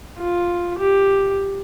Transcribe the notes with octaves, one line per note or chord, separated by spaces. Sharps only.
F4
G4